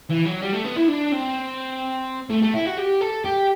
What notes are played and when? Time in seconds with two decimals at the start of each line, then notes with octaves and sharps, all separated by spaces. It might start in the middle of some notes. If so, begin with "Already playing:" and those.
0.09 E3
0.25 F#3
0.41 G3
0.53 A3
0.64 B3
0.76 E4
0.88 D4
1.12 C4
2.30 A3
2.42 A3
2.54 E4
2.65 F#4
2.77 G4
3.01 A4
3.25 G4